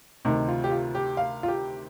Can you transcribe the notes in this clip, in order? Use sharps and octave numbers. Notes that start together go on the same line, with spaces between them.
D2 C3 D#3 D#4
F4
G4
F4
G4
F5
F4
G4